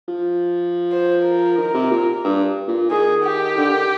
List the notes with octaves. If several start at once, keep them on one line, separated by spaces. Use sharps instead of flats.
F3
C5
A#4
D#3
C3
A#2
G2
A#2
D#3 G#4
G4
D3
D#3